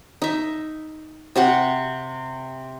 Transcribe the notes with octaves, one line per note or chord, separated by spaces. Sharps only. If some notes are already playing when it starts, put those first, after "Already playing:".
D#4 E5
C3 F#4 F#5